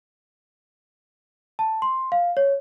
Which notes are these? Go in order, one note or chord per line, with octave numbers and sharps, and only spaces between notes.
A5
C6
F5
C#5